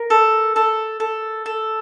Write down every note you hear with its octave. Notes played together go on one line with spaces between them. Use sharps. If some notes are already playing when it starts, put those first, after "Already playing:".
Already playing: A#4
A4
A4
A4
A4